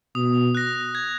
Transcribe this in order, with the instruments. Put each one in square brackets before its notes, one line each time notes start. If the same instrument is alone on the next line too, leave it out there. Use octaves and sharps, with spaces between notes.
[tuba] B2 [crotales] D#6
[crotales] F#6 A#6
G#6